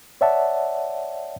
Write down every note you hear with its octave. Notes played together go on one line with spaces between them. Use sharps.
C#5 D5 E5 F#5 A5